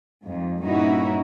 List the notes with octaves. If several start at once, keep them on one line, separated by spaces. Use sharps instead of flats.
F2 G#2
G2 A#2 C#4 D#4 E4 F#4